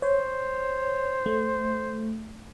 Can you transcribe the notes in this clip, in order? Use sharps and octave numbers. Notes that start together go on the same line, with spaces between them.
C5 C#5
A3